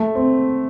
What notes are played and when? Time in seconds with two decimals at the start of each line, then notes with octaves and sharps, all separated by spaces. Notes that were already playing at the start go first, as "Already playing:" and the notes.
Already playing: A3
0.15 C4